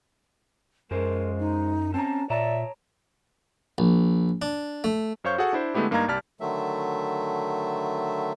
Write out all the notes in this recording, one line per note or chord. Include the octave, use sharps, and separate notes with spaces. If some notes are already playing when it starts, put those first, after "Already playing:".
F#2 F3 G#3 G#4 A#4 C5
D#4
C4 C#4 A5 A#5
A#2 C#5 D5 E5 A5 A#5
A#1
D4
A3
F#2 C5 C#5 F5 C#6 G6
F#4 G#4 A4 F#5
D4 E4 C5
D3 G#3 A3 B3 E4 G4
G2 A#3 D#4 F5 A#5 G#6
C2 G3 D5 A5 F6 B6
D3 D#3 F#3 A3 E5